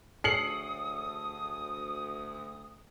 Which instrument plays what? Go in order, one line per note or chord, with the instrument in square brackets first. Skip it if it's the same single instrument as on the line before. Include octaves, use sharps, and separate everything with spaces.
[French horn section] D2 [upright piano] G#4 A4 C#5 [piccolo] D#6 [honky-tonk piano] C7 C#7 F#7